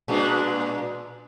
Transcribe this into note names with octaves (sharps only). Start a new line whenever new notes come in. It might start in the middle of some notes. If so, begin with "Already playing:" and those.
A#2 G#3 D4